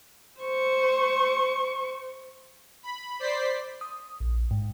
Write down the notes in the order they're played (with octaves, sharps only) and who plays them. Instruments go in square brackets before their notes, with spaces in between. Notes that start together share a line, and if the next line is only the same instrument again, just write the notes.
[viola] C5 C#6
[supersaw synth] B5
C5 D5 B6 C7
[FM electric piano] D#6
A#1
G#2